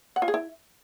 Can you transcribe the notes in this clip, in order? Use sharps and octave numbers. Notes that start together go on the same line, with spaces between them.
F#5
F4
G#4
E4